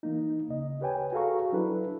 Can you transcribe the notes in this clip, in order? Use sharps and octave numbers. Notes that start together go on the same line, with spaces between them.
E3 A#3 D#4
D2 C#3 D#5
G4 B4 C#5 G5 G#5
F#4 G#4 A4 F5 A#5 C#6
F#3 D4 E4 A4 B4